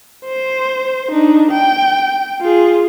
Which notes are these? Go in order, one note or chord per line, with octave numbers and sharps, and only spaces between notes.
C5
D4 D#4
G5
F4 G#4